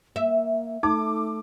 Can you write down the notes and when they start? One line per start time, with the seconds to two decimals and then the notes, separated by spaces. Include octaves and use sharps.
0.16 A#3 E5
0.83 A3 D#4 D6